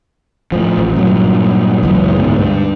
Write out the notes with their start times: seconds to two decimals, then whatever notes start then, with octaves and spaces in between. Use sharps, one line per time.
0.52 A2 F3
0.78 A1
0.96 G2 A#2 F#3
1.83 F#1 C#2 E3 F#3
2.15 D2 G#2 B2
2.39 G2